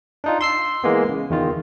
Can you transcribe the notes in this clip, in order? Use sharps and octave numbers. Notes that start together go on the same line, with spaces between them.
D4 D#4 F4
C6 E6 C7
E3 G#3 A#3 B3
C#3
E2 D#3 F4